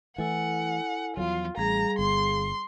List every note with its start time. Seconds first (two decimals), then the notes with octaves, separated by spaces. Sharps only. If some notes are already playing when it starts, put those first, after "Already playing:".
0.18 E3 A3 E4 A4 F#5 G#5
1.17 E2 F3 F#3 F4
1.57 A1 G3 G#4 F5 A#5
1.99 G1 C6